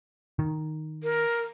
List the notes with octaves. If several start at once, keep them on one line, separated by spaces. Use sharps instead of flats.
D#3
A#4